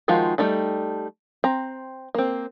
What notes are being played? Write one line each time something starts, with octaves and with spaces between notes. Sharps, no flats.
D#3 F3 G#3 F4 F#4
G3 A3 D#4 A4
C4 A#5
A#3 C4